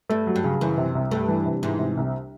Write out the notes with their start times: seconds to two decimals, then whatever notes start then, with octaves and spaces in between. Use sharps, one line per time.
0.10 G2 A3
0.27 F#3
0.36 G2
0.44 C#3
0.61 F#2 E3
0.78 C3
0.95 C2
1.11 G2 A3
1.28 E3
1.46 C3
1.63 G#2 E3
1.79 C3
1.97 C2